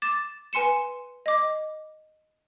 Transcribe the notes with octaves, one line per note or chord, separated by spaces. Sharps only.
D6 A6 E7
B4 G#5 C6 C#7 E7
D#5 D6